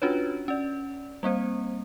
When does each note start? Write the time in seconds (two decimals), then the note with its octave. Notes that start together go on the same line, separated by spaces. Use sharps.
0.02 C#4 D4 F4 F#4 B4 C#5
0.48 C#4 D5
1.23 G3 A#3 C4 C5